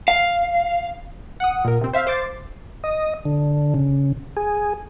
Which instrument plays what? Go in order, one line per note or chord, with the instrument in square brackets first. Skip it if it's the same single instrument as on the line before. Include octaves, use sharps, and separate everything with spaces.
[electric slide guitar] F5
[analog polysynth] F#5 D#6
A#2 A#4
C3 C4
C5 E5 F5
C5 D6 A6 C7
[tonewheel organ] D#5
D3
C#3
G#4